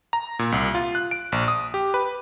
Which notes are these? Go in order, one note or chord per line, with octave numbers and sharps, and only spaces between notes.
A#5
A#2
C2
F4
F#6
D7
A#1
D#6
G4
B4